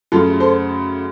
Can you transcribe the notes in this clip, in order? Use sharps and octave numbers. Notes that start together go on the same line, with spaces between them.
F#2 C#3 A3 F4 A4
A4 C5